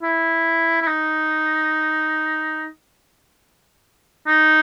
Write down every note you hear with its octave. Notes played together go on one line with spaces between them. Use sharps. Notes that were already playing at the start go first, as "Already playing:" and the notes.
E4
E4
D#4
D#4